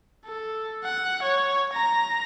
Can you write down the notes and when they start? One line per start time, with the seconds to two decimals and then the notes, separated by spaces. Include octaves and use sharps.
0.26 A4
0.85 F#5
1.23 C#5
1.73 A#5